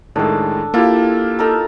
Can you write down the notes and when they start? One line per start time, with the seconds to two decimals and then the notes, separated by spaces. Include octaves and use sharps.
0.16 A2 D#3 G#3 D4 A4
0.74 A#3 E4 F4 G4
1.39 D#4 A4 A#4